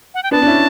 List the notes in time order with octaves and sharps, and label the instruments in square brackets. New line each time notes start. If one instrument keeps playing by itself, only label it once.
[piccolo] F#5
G5
[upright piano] B3 D4 [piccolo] A5
[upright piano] D4
C#4 E4